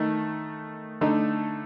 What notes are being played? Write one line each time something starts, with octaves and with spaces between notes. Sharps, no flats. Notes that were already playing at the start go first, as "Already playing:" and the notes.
Already playing: D#3 A3 D#4
D3 A3 D#4